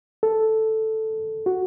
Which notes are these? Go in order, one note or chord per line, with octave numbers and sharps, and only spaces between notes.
A4
F#4